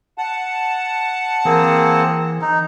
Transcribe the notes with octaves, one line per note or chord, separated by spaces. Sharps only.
F#5 A5
E3 A#3 C4 G#4
D#4